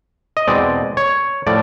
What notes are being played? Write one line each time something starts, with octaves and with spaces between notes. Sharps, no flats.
D#5
E2 B2 G#3 C4 D5
C#5
A2 F3 A3 D5